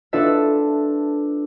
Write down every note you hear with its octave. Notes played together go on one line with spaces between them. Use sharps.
D4 F4 A4 B4 E5